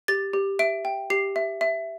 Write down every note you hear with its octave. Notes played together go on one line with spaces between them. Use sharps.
G4 A6
G4
E5 D7
G5
G4 C7
E5
E5